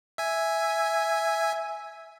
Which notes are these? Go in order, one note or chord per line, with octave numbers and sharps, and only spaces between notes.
E5 G#5